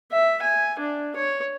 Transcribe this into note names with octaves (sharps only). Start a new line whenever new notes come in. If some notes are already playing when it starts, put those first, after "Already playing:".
E5
G#5
D4
C#5